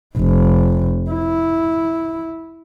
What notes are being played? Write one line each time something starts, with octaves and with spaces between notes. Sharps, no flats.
F1
E4